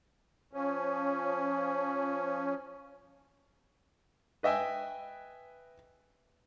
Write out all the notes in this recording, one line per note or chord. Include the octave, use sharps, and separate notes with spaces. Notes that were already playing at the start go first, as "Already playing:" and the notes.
F3 C#4
B4 D#5 E5 G5 G#5